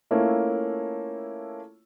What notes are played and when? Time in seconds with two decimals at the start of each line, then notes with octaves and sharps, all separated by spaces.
0.11 A3 A#3 C#4 E4 F4